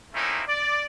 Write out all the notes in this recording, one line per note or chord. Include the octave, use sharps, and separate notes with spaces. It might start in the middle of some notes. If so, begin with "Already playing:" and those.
A3 A#3 C4 C#4 D#4 E4
D5